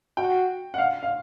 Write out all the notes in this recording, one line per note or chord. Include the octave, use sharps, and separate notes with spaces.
F#4 G5
F#5
F5
F5